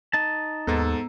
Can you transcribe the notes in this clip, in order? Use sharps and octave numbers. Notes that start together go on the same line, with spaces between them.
D#4 A5
D#2 G#2 B3 A4 A#5 E6